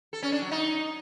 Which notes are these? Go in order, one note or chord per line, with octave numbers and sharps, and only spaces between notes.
A4
C#4
D4
F#3
D#4